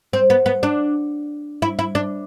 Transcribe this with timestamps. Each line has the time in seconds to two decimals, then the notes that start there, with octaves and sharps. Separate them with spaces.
0.13 C4
0.30 B3
0.46 B3
0.63 D4
1.62 E4
1.79 E4
1.95 D4